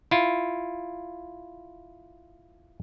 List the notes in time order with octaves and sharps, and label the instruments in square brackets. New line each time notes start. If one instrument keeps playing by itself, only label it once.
[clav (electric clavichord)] E4 F4